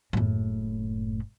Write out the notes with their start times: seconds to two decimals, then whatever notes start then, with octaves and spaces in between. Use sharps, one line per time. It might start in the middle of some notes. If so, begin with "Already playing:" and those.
0.13 F#1 A2